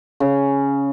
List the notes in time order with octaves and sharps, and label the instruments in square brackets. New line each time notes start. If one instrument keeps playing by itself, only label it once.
[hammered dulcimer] C#3